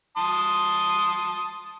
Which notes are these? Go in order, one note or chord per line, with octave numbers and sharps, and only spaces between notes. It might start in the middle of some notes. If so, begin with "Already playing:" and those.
A5 C6 D#6